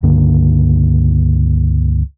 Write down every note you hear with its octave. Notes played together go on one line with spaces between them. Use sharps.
C#2 G2 D3 A#3